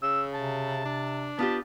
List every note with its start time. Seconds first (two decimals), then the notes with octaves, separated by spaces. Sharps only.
0.02 C#3 E6
0.34 C3 A5
0.85 D4
1.39 B3 F4 G4 A5